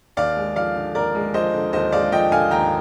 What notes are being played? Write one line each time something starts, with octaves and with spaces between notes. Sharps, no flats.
D#2 D5 F5
G#3
F3 D5 F5
D3
D#2 A#4 D5
G#3
F3 C5 D#5
D3
D#2 C5 D#5
G#3 D5 F5
F3 D#5 G5
D3 F5 G#5
D#2 G5 A#5